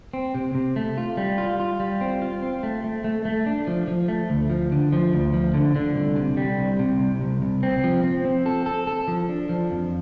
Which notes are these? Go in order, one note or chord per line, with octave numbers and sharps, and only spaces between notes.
C4
C3
C3
A3
F4
G3
F4
F4
G3
C4
F4
C4
A3
A3
A3
A3
D4
F3
F3
A3
D2
F3
D3
F3
D2
F3
D3
D3
C2
C3
G3
C2
C3
C2
C2
C2
C4
F3
C4
C4
A4
A4
A4
F3
D4
F3
F2